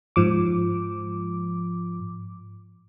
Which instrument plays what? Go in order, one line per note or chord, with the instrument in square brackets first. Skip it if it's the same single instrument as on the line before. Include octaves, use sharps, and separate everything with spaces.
[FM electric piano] G#2 F3 D6